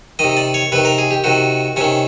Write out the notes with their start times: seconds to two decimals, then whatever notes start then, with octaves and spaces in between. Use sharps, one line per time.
0.19 C3 D#3 D#5
0.37 D5
0.54 C#5
0.72 C3 D#3 B4
0.85 A#4
0.98 G#4
1.11 G4
1.24 C3 D#3 F#4
1.76 C3 D#3 C#4